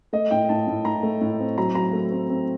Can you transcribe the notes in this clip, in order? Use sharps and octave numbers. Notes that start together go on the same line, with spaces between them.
A3 D#5
A2 G5
A2 A5
A2
A2 A#5
A3
A2
C4
F#3 A#5
F#3 A#5
A3
C4
C4